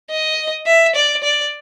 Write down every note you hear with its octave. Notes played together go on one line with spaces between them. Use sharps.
D#5
E5
D5
D5